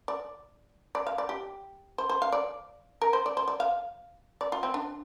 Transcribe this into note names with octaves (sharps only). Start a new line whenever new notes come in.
D5
D5
F5
D5
G4
C5
C5
F5
D5
A#4
C5
D5
C5
D5
F5
D5
F4
C4
D4